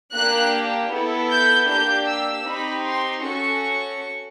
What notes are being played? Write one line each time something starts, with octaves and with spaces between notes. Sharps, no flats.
A#3 D4 G4 F#6
B3 E4 A4
G6
A#3 D4 G4 G6
E6
C4 D#4 G4 B5
C6
C#4 F#4 A4 C#6